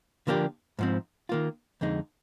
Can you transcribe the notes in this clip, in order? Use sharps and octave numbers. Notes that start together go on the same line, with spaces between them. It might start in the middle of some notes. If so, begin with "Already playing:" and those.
D3 F3 A#3 D4 G4
G#2 F3 C4
D#3 A#3 F4
F2 D3 G#3 D#4